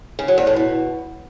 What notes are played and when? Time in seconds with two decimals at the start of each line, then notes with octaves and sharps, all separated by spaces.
0.19 C#3
0.28 F#3
0.38 E2
0.47 A2
0.56 B2